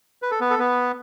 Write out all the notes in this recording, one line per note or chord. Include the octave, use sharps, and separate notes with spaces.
B4
A4
B3 B4
A4
B3 B4